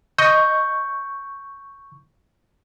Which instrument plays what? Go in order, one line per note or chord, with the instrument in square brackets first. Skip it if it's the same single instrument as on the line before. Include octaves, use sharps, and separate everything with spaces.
[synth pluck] D#5 [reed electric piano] C#6 G6